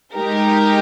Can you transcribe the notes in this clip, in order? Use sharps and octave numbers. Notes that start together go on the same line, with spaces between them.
G#3 D#4 G4 A#4